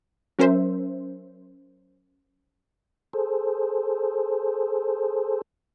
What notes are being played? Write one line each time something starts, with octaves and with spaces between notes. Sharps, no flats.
F#3 C#4 A#4 C5 E5
G#4 A4 C5